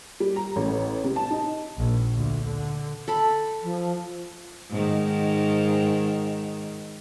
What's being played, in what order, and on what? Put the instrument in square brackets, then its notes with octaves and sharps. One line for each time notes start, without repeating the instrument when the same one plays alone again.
[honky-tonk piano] G3
A#5
A1
C3
A5
D#4
[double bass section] A#1
D2
D3
[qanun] A4 B5
[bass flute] F3
[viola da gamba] G#2 D#3